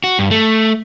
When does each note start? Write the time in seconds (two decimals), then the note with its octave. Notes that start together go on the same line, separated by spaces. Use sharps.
0.04 F#4
0.19 G2
0.31 A3